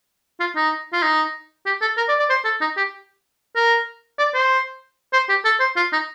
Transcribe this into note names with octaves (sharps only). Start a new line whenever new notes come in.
F4
D#4
F4
D#4
G4
A4
A#4
D5
D5
C5
A4
D#4
G4
A#4
D5
C5
C5
G4
A4
C5
F4
D#4